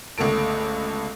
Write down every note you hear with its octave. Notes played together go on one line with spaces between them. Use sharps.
G1 C#2 A3 A4 D7